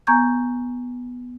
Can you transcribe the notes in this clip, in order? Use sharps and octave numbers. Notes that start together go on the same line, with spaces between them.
B3 G#5 A#5 C#6 G6 G#6